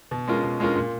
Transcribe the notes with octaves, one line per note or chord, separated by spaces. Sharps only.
B2
G#3 C#4 F4 A#4
B2
G#3 C#4 F4 A#4
A#2